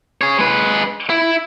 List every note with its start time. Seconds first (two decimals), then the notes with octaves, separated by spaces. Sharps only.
0.21 G#4 C#5
0.39 G#3 B4
1.10 E4